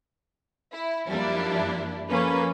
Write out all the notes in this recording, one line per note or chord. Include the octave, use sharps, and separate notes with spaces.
E4
F#2 F3 G3 A#3 D4 E4
F3 A#3 C#4 A4 B4